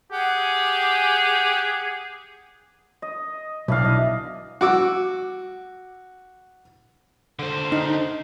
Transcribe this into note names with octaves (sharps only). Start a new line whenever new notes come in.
G4 G#4 F#5
D#5
B1 E3 D4 F5
D#5
F#4 D6 E6
D3 C5
D#4